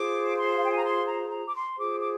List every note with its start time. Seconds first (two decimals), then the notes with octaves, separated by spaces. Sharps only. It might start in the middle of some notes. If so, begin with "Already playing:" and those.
Already playing: F4 G#4 C5 D6
0.39 C6
0.55 F5
0.62 G5
0.70 G#5
0.78 A#5
0.85 C6
1.08 A#5
1.31 A#5
1.46 D6
1.55 C6
1.77 F4 G#4 C5 D6
1.99 D6